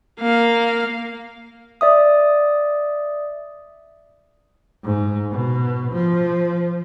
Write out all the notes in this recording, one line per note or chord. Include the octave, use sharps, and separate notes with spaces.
A#3 F5
D5 E5 D#6
G#2
B2
F3